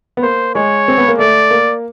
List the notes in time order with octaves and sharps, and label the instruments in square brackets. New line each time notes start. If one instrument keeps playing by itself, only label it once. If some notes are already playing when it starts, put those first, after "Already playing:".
[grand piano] B3
[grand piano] A#3 [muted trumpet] C5
[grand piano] G#3 [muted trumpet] C#5
[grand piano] C4
B3
A#3
[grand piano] A3 [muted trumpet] D5
[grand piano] A#3